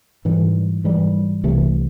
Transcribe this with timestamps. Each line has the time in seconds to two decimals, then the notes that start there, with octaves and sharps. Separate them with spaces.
0.25 G#2 E3 G3
0.84 G#2 E3 G3
1.43 C2 C3 E3 A3